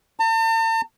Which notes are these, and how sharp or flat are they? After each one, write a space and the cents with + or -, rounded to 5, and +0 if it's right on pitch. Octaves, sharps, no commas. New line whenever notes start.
A5 +45